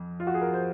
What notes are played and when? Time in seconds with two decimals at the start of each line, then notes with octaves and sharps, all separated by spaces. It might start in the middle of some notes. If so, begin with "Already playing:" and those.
Already playing: F2 F3
0.20 F4
0.27 F#4
0.34 G#4
0.41 A#4
0.54 C5